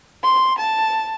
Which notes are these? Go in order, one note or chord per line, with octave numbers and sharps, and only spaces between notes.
C6
A5